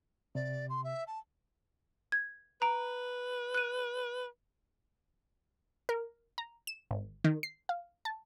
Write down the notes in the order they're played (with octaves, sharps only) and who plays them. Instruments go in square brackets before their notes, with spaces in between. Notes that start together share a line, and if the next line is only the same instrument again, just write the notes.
[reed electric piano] C3 [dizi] D5
[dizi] C6
E5
A5
[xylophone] G#6
[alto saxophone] B4 [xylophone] A#5 D7
[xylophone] F#6 D#7
[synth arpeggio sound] A#4
A#5
E7
G#1
D#3
C7
F5
A5